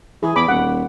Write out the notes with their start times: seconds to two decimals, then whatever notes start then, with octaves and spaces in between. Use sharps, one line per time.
0.23 E3 G#4
0.36 E2 B5 D6
0.49 D#1 F#5